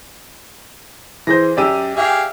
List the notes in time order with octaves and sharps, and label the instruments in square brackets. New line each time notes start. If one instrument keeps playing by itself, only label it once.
[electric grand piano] E3 G#4 C5 [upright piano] G6 A#6
[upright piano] F#2 G4 E6 [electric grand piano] D5 D#7
[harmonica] G4 G#4 F5 [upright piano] E5